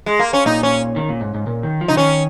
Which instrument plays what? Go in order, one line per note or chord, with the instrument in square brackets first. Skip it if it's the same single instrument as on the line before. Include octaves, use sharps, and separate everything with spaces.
[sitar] G#3
A#3
C#4
[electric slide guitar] A#2 [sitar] D#4
[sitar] C#4
[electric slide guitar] D#3
A#2
G#2
G#2
A#2
D#3
F3
[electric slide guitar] C#3 [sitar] D#4
[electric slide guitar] D#3 [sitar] C#4